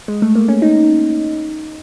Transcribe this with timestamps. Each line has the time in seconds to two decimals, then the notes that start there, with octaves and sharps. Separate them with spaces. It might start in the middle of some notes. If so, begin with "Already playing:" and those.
0.08 G#3
0.22 A3
0.35 A#3
0.48 C#4
0.62 D#4